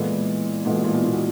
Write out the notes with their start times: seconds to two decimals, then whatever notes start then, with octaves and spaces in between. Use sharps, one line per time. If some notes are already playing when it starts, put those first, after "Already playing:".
Already playing: A#2 E3 G#3 B3 E4 A4
0.65 A#2 E3 G#3 B3 E4 A4
0.75 B2
0.84 A#2
0.94 B2
1.04 A#2
1.13 B2